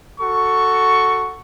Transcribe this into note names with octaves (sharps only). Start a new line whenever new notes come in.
F#4 A4 C#6